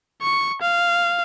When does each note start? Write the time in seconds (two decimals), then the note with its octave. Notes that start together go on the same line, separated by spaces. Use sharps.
0.22 C#6
0.62 F5